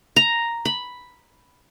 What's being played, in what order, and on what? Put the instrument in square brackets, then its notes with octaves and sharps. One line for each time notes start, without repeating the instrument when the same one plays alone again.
[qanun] A#5
B5